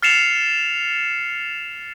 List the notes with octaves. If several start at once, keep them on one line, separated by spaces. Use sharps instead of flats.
F6 A6 C7 C#7 E7 F7